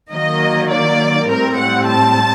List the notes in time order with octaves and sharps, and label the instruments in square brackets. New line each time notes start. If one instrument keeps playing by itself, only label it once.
[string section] D#3 F#3 A#3 D#5
D5
A2 G3 C4 A#4
F#5
A5